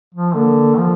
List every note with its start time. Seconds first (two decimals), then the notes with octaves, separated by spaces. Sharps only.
0.14 F3
0.35 D3 A#3
0.79 F3